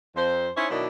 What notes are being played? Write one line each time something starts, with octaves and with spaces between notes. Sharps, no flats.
F2 C5
C#4 D#4 E4 C5 C#5
B2 D#3 F#3 D4 E4 D#5